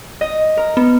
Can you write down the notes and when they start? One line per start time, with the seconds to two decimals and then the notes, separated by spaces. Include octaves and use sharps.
0.21 D#5
0.57 A#4
0.77 B3